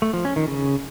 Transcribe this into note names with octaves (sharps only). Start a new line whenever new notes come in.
A3
F3
C#4
D#3
C#3